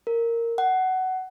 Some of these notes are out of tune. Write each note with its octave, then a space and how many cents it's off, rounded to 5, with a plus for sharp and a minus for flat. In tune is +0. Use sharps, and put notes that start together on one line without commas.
A#4 -10
F#5 +15